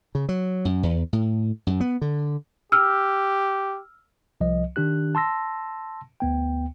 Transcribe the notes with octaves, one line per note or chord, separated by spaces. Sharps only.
C#3
F#3
F#2
E2
A2
F#2
B3
D3
G4 E6 F6
C2 F3 D#5
D#3 D4 G4 F#6
A5 C6 E6 A#6
D2 B3 G5